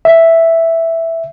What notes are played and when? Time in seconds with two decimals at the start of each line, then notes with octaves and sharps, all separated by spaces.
0.05 E5